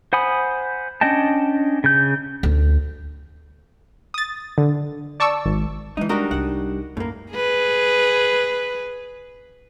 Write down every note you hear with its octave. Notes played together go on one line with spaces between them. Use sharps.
C5 F#5 G#5 B5 D#6
C#4 D4 D#5 G5 A5
C#3 G6
D2
D#6 A6
D3
D5 A5 C#6 D6 E6
G#1
E3 G#3 D#4
G3 D4 D#4 F#4 A#4
C2 D#4 F#5
F#2 A2 A#3
G#4 B4